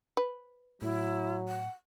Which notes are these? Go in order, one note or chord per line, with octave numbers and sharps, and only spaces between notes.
B4
A2 F#3 E4
F#5